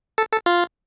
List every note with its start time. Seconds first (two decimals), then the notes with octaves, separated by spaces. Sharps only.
0.18 A4
0.32 A4
0.46 F4